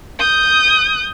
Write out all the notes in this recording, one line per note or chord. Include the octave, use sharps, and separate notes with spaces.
D#6 G6